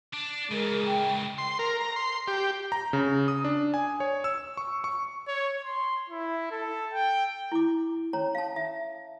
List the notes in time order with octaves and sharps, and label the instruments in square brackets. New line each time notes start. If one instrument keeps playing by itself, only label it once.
[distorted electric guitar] D4
[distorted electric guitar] C#3 E3 [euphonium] G#3 [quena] A#4
[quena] G5
[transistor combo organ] C6
A#4
A#5
C6
G4
[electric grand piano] A#5
C#3
D#6
D4
G#5
C#5
E6
C#6
C#6
[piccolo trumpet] C#5
C6
E4
A4
G5
[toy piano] E4 D6
C#4 C#5 A#5
F5 A5
E5